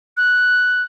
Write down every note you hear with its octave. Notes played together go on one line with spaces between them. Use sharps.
F#6